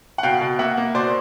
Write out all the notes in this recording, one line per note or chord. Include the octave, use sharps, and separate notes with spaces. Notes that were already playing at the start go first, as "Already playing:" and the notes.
F#5
B2 F5 G5
B2
A#3 E5 F#5
A#3
B2 C5 D5